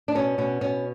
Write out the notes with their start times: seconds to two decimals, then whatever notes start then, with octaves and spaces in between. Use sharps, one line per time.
0.08 D4
0.15 B2 C#4
0.38 B2 C#4
0.61 B2 C#4